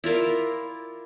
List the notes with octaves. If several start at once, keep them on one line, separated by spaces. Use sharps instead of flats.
E4 F4 A#4 D5